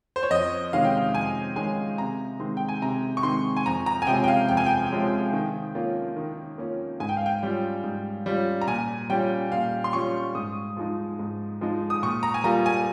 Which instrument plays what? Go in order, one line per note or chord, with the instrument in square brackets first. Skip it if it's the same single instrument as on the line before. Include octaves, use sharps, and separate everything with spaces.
[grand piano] C5
C#5
F2 D#5
C3 D#3 G#3 C#4 F5
G5
F5
F2 G#5
C3 D#3 G#3 C#4 G#5
C3 A#5
D#3 G#3 C4
G5
G#5
C3 A#5
C#6
D#3 G#3 C4 C6
G#5
F2 A#5
A#5
G#5
C3 F3 G#3 C#4 G5
G5
F5
F2 G5
G#5
G5
C3 F3 G#3 C#4
D#3
A#3 C#4 F4
D#3
A#3 C#4 F4
G#2 G#5
G5
F5
G5
G3 C#4 F4
G#2
G3 C#4 F4
A#5
A#2 G#5
G3 C#4 F4 G5
A#2 F5
C6
G3 C#4 F4 C#6
G#2 D#6
F3 G#3 D#4
G#2
F3 G#3 D#4
D#6
A#2 C#6
A#5
G#5
G3 A#3 F4 A#5
G#5